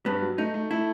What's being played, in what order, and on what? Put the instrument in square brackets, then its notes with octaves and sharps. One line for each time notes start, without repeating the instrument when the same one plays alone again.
[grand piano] G2 [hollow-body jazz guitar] B3
[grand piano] F#3
[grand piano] A3 [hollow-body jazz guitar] D#4
[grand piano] A3
[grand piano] A3 [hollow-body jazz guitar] E4